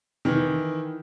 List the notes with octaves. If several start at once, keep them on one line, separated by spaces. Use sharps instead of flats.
D#3 E3